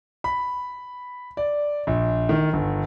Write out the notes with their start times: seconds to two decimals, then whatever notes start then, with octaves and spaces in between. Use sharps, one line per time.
0.24 B5
1.37 D5
1.87 A#1
2.29 D#3
2.53 G1